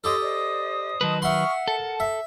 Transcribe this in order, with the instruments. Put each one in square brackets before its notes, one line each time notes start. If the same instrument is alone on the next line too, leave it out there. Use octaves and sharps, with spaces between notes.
[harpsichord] G4 A4 [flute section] C#5 D#5 C6 [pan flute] D#6
[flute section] C5 D5 D#5
[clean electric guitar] D#3 F#3 B4 [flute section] D#5 A5 C6
[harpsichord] E5 C6 [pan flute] F#5 [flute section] C#6 D#6 F6
[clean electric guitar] A4 [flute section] A#4 A5
[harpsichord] E5